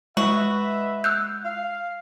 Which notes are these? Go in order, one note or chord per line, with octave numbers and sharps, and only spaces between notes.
G#3 F#4 B4 D#5 E5
E6 F#6 G6
F5